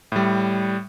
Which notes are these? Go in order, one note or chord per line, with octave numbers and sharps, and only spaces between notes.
A2 G3